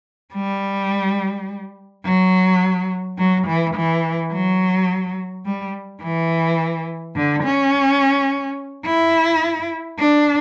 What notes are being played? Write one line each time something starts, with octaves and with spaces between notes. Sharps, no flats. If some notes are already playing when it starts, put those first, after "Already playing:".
G3
F#3
F#3
E3
E3
F#3
G3
E3
D3
C#4
E4
D4